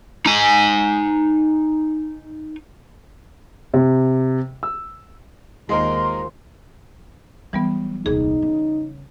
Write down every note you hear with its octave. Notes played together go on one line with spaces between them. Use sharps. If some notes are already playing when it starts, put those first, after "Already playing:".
D#4 G#5
C3
E6
D#2 G#3 D#4 F4 A#4 C5 C6
E3 F#3 G3 B3
D#1 C2 D#4 G#4
C#3